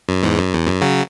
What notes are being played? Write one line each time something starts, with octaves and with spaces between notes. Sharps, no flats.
F#2
E2 G#2
F#2
E2
F#2
C#3 F#3